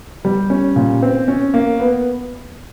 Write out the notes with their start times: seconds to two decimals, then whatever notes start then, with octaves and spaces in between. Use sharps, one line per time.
0.25 G3
0.50 C#4
0.76 A#2
1.03 C4
1.28 C#4
1.54 A#3
1.80 B3